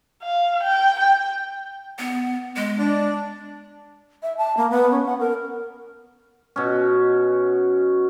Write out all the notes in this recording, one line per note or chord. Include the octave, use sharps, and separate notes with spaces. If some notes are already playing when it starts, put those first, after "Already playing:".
F5
G5
G5
B3
G#3
D4
E5
A5
A#3
B3
C#4
F#5
A#4
B2 C#4